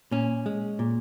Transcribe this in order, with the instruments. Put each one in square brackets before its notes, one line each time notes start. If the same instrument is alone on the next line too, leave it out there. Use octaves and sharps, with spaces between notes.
[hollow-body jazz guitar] A#2 C#4
G#3
A#2